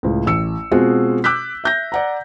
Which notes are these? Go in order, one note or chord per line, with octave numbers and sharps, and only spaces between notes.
C#2 A2
A1 E6 C#7
B2 G#3 C4 F4 F#4 G#4
D6 E6 F#6 G6 B6
E5 G6 A#6
D5 F#5 A#5